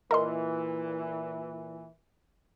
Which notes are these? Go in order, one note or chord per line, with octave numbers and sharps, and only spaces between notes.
A#2 E3 A#4 D#5 C6